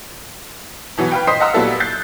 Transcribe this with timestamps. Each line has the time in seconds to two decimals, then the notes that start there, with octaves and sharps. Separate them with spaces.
0.97 B2 E3 F#3 B3
1.12 B4 F5 G5
1.27 C5 D#5 C6 D#6 B6 C7
1.40 D#5 F5 F#5 A#5 C6 E6
1.54 A#2 F#3 G3 B3 E4 A4
1.80 F#6 G6 A6 C7